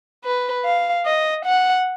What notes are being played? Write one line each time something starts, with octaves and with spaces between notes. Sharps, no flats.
B4
F5
D#5
F#5